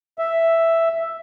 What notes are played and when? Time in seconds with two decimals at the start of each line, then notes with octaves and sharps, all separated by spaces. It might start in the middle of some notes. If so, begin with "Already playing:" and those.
0.19 E5